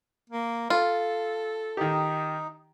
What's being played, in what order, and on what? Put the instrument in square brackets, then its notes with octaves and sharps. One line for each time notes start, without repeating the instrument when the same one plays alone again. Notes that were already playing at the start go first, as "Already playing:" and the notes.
[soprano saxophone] A#3
[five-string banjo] F4 [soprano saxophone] A4
[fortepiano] D#3 G4 [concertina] D#4